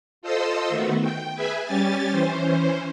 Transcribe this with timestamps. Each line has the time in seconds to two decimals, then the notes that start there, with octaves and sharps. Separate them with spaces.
0.22 F4 A4 C5 D#5 C6 E6
0.69 D#3 A3 B3 F#4
1.01 G5
1.35 G#4 B4 E5 G#5
1.65 G3 C#4 G4 G#5 A6
2.11 E3 C#4 C5